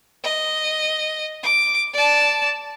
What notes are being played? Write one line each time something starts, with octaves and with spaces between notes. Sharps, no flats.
D#5
D6
D5 A5